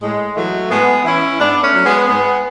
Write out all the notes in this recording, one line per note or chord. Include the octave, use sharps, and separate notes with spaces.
A2 G#3
E3 F#3 A3
A2 G#3 B3
E3 C#4 E4
G#2 B3 D4
A3 C#4
F#3
G#3 B3
G#2 G#3 B3